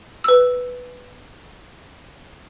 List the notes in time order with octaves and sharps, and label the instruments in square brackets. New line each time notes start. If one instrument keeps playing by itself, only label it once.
[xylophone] B4 E6